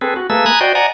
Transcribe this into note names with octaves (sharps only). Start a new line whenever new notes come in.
C4 G#4 A4 B4
F#4
A3 A#3 G#4 A4 B4 E6
G#5 A#5 B5 D#6 F#6 G#6
F#4 C5 D5 D#5 G5
D5 D#5 F#5 G#5 A#5